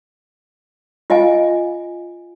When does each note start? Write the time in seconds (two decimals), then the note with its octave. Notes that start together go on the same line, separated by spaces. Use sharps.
1.10 F4 D#5 F5 G#5